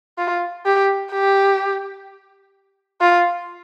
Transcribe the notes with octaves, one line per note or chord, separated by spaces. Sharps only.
F4
G4
G4
F4